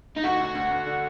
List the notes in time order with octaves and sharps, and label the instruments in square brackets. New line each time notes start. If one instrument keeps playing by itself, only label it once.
[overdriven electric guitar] D#4
[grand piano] D2 [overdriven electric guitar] F#4
[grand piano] D2
D2
D2
D3